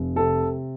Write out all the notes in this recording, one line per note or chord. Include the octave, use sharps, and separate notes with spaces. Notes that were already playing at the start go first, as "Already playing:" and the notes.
Already playing: F1
C3 A4